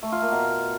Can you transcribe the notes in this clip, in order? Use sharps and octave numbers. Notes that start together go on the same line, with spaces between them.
A3
F4
A#3
B2